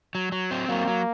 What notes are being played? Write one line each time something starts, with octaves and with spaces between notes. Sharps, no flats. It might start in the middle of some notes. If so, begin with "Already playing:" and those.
F#3
F#3
C4
F#3 A#3
F#3